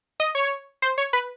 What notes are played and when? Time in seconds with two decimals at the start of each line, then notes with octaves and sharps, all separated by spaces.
0.20 D#5
0.35 C#5
0.82 C5
0.98 C#5
1.13 B4